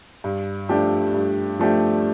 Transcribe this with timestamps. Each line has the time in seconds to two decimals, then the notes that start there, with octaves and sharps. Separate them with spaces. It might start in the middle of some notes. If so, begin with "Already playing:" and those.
0.24 G2
0.69 F3 A3 D4 G4
1.15 G2
1.59 F3 A3 D4 G4